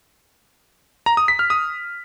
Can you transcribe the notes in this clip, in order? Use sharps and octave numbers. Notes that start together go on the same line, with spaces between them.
A#5
D#6
B6
F6
D#6